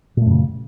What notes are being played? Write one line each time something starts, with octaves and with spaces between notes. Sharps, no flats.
F#2 A#2 C#3 A3